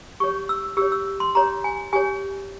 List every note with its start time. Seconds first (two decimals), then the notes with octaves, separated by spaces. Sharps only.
0.20 G4 C#5 C#6
0.49 E6
0.77 G4 C#5 E6
0.92 E6
1.20 C6
1.35 G4 C#5 A#5
1.64 G#5
1.93 G4 C#5 G#5